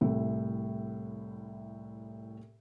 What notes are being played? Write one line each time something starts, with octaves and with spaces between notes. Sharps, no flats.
C2 A2 E5